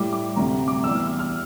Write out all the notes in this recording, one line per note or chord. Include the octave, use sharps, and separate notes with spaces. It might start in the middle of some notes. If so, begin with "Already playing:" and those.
Already playing: A2 G3 D6
D6
D2 C3 G3 A#5
D6
E2 E3 G3 E6
F6
E6
F6